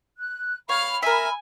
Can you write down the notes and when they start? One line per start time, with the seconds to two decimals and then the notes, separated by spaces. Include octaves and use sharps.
0.18 F#6
0.69 C#5 F5 B5 F6
1.03 A#4 E5 G#5